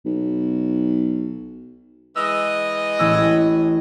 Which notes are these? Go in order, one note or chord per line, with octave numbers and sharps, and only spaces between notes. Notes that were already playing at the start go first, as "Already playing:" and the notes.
B1
E3 G#3 D#5 E6
A1 C#4 E6